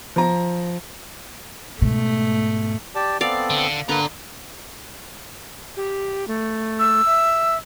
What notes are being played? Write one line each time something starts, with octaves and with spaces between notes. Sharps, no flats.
F3 A#5
G#2 B2 A3
G4 D5 A5
B3 C4 A4 D5 F5
D3
D3 A#3 B4 D5 A#5
G4
A3
E6
E5